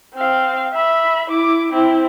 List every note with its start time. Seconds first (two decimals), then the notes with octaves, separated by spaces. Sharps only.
0.15 C4 F5
0.74 E5 B5
1.30 E4 D6
1.72 C4 E4